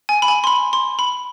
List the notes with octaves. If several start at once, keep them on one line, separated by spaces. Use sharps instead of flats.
G#5
B5
G#5
C6
B5
C6
B5